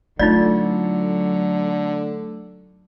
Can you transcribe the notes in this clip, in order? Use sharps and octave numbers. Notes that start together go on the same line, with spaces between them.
D3 F#3 A3 D#4 F4 D5